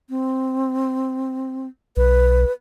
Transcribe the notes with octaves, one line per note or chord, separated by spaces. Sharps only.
C4
B1 B4